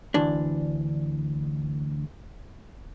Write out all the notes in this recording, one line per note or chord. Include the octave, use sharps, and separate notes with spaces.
D2 E3 D4